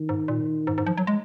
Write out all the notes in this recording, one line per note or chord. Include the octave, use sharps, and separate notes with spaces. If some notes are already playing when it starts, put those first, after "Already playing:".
Already playing: D#3
G#2
A#2
G#2
G#2
F3
F#3
G#3